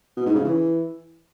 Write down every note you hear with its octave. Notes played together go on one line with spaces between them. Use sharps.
B2
G#2
C#3
E3